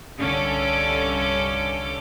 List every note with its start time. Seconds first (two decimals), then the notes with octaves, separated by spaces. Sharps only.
0.16 C2 G2 D3 C#4 A4 D6